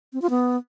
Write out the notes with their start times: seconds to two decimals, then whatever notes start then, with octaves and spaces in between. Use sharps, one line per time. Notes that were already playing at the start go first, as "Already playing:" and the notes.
0.13 C4
0.21 F4
0.30 B3